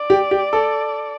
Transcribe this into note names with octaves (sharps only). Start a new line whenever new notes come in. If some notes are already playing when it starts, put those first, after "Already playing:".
Already playing: D5
G4
G4
A4